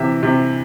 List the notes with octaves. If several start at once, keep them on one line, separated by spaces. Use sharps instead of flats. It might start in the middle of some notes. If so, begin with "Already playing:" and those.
Already playing: C3 E3 E5
C3